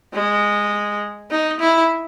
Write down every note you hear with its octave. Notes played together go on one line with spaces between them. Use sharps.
G#3
D#4
E4